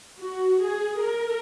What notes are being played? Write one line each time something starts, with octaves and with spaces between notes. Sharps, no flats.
F#4
G#4
A#4